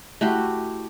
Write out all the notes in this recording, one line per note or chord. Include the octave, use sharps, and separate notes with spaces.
A3 E4 F#4 G4